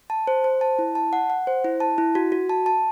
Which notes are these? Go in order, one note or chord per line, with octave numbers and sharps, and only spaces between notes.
A5
C5
C5
A5
E4
A5
F#5
F#5
C5
E4
A5
E4
F#4
F#4
A5
A5